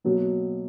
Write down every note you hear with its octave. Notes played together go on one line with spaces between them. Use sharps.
B2 F#3 A#3